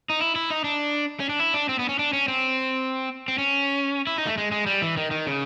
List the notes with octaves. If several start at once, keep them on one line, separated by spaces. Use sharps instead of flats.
D#4
E4
E4
D#4
D4
C#4
D4
E4
D4
C4
B3
C#4
D4
C#4
C4
C4
C#4
E4
D#4
A3
G#3
G#3
G3
E3
D#3
D#3
C#3